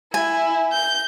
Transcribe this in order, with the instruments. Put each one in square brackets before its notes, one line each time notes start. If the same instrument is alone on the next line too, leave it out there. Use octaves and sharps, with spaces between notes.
[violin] E4 [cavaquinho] G#5
[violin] G6